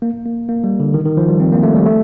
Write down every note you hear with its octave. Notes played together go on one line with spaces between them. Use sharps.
A#3
A#3
A#3
G3
D3
D#3
D#3
F3
G3
C4
A#3
A3
G3
A3